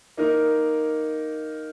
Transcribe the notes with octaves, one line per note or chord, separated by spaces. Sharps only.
A#3 D#4 A#4